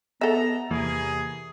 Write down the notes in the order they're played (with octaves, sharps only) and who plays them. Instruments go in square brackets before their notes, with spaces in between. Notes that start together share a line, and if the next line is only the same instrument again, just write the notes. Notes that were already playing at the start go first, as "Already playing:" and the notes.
[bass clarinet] B3 [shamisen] A4 E5 [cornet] A#5
[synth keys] E2 E3 A#3 [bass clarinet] C3 [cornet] G#4